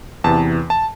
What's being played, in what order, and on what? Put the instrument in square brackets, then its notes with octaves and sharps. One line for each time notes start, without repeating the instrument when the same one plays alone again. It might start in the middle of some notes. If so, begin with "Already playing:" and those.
[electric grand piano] E2 C3 E3 A5
A5